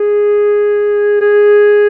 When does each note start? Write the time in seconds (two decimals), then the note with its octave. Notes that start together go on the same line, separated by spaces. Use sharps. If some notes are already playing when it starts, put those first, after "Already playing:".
Already playing: G#4
1.21 G#4